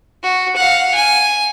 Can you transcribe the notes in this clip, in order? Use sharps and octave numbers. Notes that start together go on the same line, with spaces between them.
F#4
F5 F#5
G#5